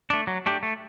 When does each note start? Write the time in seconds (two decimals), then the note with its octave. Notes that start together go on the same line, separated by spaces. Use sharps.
0.10 A3 D4
0.27 F#3
0.46 A3 D4 G4
0.63 A3